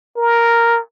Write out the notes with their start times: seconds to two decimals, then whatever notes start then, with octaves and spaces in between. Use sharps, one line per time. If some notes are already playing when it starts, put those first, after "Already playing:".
0.17 A#4